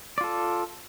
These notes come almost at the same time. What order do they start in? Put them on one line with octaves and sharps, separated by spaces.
D5 F4 A4